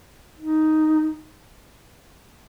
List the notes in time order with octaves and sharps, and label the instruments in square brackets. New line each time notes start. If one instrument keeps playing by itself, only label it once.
[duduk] D#4